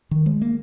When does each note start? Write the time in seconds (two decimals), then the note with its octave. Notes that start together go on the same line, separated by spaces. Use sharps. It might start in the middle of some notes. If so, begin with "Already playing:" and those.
0.11 D#3
0.26 G#3
0.41 A#3